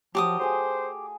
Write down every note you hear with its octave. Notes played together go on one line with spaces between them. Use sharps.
F3 F#3 G4 A#4 D6 D#6
A3 G#4 C5 G#5